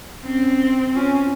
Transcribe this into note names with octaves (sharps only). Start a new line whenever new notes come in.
C4 C#4
C#4 F4